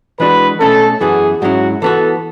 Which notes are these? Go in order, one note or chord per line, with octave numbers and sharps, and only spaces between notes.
E3 G#3 D4 F#4 B4
B2 A3 C#4 A4
F#2 E3 B3 F#4 G#4
G#2 F#3 C#4 E4 F#4
E3 B3 F#4 A4